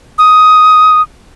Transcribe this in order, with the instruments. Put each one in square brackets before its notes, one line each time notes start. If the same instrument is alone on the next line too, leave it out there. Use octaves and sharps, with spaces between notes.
[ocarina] D#6